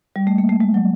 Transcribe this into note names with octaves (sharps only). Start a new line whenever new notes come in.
G3
A3
A#3
A3
G#3
F#3